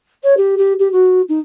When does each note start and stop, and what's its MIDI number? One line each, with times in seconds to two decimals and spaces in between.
0.23 0.34 73
0.37 0.55 67
0.57 0.73 67
0.79 0.90 67
0.92 1.21 66
1.28 1.39 63